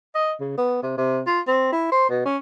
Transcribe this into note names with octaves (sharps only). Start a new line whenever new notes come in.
D#5
C#3
B3
C3
C3
F4
C4
E4
C5
B2
C#4